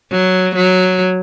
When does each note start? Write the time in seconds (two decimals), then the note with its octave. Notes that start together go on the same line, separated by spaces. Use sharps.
0.11 F#3
0.56 F#3